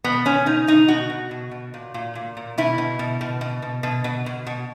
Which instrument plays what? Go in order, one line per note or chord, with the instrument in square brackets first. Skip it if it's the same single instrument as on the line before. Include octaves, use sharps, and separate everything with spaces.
[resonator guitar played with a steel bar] B2 B3
B2 C#4
B2 D#4
B2 D#4
B2 F#4
B2
B2
B2
A#2
A#2
A#2
A#2
B2 E4
B2
B2
B2
B2
B2
B2
B2
B2
B2